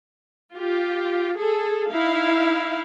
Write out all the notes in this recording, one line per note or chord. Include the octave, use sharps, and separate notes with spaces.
F4 G4
G#4 A4
D#4 E4 F5